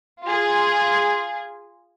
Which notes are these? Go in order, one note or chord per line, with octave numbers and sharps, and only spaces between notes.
F4 G#4